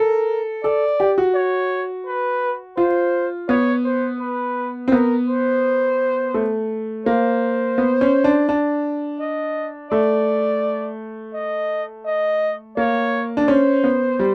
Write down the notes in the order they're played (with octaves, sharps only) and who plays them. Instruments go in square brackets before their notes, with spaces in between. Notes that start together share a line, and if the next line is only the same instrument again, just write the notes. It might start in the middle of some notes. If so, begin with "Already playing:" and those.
Already playing: [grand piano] A4 [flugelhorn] A#4
[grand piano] A4 [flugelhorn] D5
[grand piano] G4
F#4
[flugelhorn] C#5
B4
[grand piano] F4 [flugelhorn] C5
[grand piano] B3 [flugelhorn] C#5
[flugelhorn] C5
B4
[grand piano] C4
[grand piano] B3 [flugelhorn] A#4
[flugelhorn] C5
[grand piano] A3
[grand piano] A#3 [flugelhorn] C5
[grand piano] B3
C#4
D4
D4
[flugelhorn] D#5
[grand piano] A3 [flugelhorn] D5
[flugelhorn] D#5
D#5
[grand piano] A#3 [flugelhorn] C#5
[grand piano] D4
[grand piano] C#4 [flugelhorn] C5
[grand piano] B3
G3